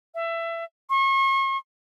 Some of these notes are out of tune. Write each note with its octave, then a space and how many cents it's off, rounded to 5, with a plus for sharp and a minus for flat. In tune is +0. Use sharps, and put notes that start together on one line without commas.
E5 +20
C#6 -40